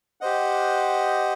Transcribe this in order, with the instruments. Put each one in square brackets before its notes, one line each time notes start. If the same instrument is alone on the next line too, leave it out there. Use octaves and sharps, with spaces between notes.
[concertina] G4 C5 D#5 F#5